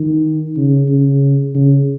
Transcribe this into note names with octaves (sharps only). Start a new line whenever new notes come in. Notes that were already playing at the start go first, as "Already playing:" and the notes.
Already playing: D#3
C#3
C#3
C#3